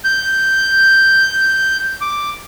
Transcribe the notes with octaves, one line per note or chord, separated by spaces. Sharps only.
G6
D6